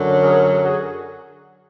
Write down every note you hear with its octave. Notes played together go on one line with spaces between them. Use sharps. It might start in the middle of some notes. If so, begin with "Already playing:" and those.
Already playing: F#2 D3 F#3
G#4 A#4
F#4 G#4